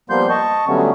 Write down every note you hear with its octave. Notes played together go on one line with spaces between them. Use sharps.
F3 G3 A#3 B3 C6 G6
D#5 A5 C#6
D3 F#3 G3 A3 B3 C#4